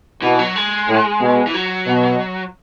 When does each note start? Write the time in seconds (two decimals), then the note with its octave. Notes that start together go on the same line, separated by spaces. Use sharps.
0.22 B2 E3
0.39 F#3
0.56 G#3
0.88 A2
1.21 B2
1.47 E3
1.54 F#3
1.87 B2